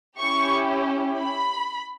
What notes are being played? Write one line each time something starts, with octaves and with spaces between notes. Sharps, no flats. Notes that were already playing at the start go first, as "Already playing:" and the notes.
C#4 E4 G4 C#6
B5